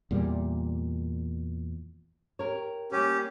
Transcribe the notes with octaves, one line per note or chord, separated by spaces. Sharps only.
E2 A#2 G3
G4 A#4 C#5
G3 A#3 C#4 G4